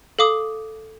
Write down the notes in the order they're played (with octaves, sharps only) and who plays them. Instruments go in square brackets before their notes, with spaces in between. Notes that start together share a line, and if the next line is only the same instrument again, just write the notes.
[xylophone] A4 F5 D6 D#6